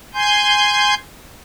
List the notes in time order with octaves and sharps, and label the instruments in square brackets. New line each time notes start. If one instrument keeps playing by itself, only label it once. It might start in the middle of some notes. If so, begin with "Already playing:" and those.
[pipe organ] G#5 C6 G6